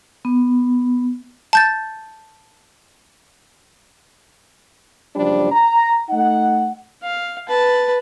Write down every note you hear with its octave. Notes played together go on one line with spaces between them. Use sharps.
B3
A5 G6 A6
F#1 F3 G3 D4
A#5
A3 D#4 F#5
F5
B4 A5